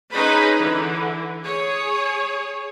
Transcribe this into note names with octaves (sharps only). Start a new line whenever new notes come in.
C#4 D#4 G#4 B4 C5 B5
D3 E3
G#4 C#5